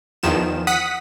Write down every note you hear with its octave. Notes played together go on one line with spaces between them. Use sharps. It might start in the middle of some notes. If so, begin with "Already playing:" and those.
E2 D#3 F3 E7
F#5 D#6 B6